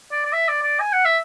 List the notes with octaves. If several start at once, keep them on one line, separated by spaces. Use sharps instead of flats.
D5
D5
E5
D5
D5
G#5
F#5
E5